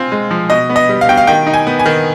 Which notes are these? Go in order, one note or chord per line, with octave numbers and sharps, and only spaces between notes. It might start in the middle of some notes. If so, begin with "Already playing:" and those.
Already playing: C4 F4 G#5
G#3
F3
B2 D#5
B3
D#5
G3
F5
B2 G5
F5
D#3 G5
D#4
G#5
B3
G#5
D#3